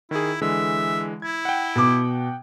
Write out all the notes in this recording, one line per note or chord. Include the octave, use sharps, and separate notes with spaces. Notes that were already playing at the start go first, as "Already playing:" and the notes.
D#3 E4 G#4
D3 E3 G#3 E5
E4 G#6
F#5 G5
B2 D6